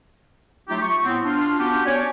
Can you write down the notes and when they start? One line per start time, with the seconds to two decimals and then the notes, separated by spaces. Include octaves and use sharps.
0.69 F#3 A3 D#4 F4 G4
0.82 C#6
1.03 A2 B3 C4
1.25 D4 F4
1.59 B3 C#4 D4 F#4 G4
1.86 C#5 D5 G#5